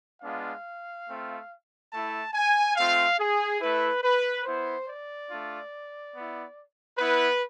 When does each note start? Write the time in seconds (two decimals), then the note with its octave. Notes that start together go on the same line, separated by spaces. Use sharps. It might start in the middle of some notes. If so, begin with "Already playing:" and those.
0.22 G#3 B3 D4 F4 F5
1.07 A3 C4 F4
1.92 A3 E4 A5
2.34 G#5
2.76 A3 C4 F4 F5
3.18 G#4
3.60 A3 E4 B4
4.03 B4
4.44 B3 E4 C5
4.87 D5
5.29 A3 D4 F4
6.13 B3 E4
6.98 B3 E4 B4